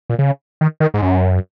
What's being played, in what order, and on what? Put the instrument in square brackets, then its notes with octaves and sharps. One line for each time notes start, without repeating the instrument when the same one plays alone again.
[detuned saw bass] A#2
C#3
D#3
D#3
G#2
F#2